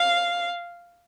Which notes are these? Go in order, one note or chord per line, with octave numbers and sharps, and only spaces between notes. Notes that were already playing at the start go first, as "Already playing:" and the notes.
Already playing: F5